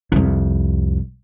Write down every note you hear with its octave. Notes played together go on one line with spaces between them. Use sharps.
C2 F2